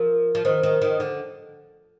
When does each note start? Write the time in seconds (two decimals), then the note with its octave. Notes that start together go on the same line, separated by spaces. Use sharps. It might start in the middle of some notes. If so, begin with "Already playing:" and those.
Already playing: F3 A#4
0.35 F3
0.45 D#3 C5
0.63 D#3
0.82 D#3
1.00 D3